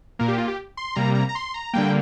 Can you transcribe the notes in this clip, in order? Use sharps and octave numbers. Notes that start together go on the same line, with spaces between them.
A#2 A#3 A#4
G4
F4
G4
C6
C3 G3 A#3 A#5
A#5
A#5
C6
A#5
D3 G3 A#3 G5